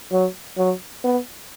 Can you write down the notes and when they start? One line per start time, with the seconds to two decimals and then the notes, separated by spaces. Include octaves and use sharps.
0.12 F#3
0.57 F#3
1.04 B3